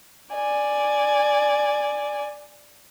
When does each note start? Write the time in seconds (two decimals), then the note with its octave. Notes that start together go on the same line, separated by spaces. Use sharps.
0.34 D5 G#5